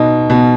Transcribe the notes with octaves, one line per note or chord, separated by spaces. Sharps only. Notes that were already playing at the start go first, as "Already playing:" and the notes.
Already playing: B2 D#4
B2